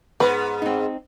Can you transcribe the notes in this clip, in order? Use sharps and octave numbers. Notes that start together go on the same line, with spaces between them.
G#2 B3 B4
C4 D#4